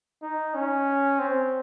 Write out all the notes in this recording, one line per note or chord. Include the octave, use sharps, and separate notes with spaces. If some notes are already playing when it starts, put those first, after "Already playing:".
D#4
C#4
C4